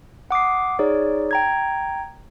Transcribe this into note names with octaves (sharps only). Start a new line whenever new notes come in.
F#5 D6 D#6 C7
D#4 G#4 C#5 D5
G5 A#5 G#6